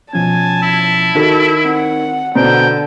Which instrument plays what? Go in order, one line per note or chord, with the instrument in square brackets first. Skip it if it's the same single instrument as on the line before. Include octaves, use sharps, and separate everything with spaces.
[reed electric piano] B2 F3 C#4 [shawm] G#5 [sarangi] A5
[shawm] E4
[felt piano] D#3 [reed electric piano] D#4 F#4 A4
[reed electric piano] C4 [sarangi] F#5
[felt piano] B2 [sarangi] D3 [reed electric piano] C5 A#5 [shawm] G5